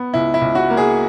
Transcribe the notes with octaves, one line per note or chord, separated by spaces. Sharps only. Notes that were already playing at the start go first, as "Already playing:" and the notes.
Already playing: B3
C#2 E4
E4
C#2
F#4
A#3
G#4